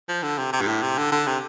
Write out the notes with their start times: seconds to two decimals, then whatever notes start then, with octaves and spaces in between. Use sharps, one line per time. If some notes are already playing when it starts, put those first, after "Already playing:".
0.09 F3
0.23 D3
0.38 C3
0.53 C3
0.61 G2
0.67 A2
0.82 C3
0.98 D3
1.12 D3
1.27 C3